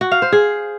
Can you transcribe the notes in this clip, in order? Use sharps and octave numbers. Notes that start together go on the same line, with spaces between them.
F#4
F5
C5
G#4